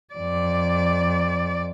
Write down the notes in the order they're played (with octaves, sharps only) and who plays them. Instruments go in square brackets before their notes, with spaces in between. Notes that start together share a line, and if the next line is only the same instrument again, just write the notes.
[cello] F2 D5